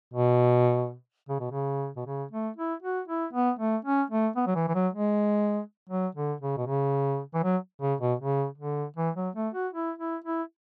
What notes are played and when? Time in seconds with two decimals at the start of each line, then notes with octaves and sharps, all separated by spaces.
0.14 B2
1.29 C#3
1.40 B2
1.51 C#3
1.97 B2
2.06 C#3
2.31 A3
2.57 E4
2.82 F#4
3.08 E4
3.33 B3
3.59 A3
3.85 C#4
4.10 A3
4.36 B3
4.47 F#3
4.55 E3
4.68 E3
4.75 F#3
4.93 G#3
5.90 F#3
6.15 D3
6.41 C#3
6.57 B2
6.66 C#3
7.34 E3
7.43 F#3
7.81 C#3
8.01 B2
8.20 C#3
8.58 D3
8.97 E3
9.16 F#3
9.36 A3
9.54 F#4
9.73 E4
9.99 E4
10.25 E4